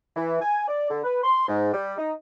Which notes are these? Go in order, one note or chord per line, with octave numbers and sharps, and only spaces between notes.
E3
G#5
D5
D3
B4
C6
G#2
G3
D#4